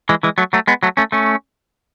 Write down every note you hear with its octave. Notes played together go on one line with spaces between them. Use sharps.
E3 G#3
E3 G#3
F#3 A3
F#3 A3
G#3 B3
F#3 A3
A3 C#4
A3 C#4